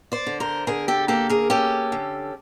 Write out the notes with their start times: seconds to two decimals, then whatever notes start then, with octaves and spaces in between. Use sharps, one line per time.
0.12 C5 D5
0.27 D3
0.40 A#4 C5
0.67 D3 G#4 A#4
0.88 G4 A4
1.08 A#3 G4 A4
1.29 G#4 A#4
1.50 C#4 G4 A4
1.92 D3